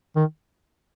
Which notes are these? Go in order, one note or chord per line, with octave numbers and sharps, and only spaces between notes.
D#3